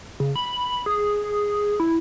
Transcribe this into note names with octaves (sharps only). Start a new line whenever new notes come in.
C#3
B5
G#4
E4